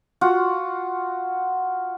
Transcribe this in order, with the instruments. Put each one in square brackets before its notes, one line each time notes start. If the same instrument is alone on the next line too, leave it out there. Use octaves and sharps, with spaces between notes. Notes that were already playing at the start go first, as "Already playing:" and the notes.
[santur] F4 F#4 F#5